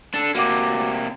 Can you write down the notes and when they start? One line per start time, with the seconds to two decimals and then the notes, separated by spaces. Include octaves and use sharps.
0.14 D4 A4
0.35 C3 A#3 F#4 F#5 D6